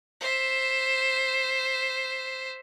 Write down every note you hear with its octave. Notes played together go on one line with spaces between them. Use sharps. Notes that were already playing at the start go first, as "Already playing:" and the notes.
C5 E5